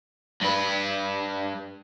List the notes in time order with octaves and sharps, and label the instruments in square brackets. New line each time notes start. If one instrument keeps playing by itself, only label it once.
[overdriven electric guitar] G2 B4